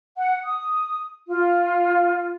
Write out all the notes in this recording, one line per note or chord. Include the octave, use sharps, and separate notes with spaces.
F#5
D#6
F4